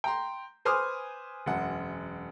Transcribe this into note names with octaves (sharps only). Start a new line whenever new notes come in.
G5 A#5 C6
B4 C5 G#5 D6 D#6 F6
E1 F#2 F#5